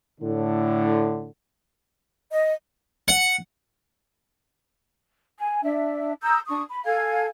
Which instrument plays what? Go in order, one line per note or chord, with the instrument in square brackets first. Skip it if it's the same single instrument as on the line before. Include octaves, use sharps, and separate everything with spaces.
[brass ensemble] A2 D3
[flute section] D#5
[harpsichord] F#5
[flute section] G#5
D4 E5
A#5 D#6 E6 G6
D4 C#6 D#6
B5
A4 F5 G#5 G#6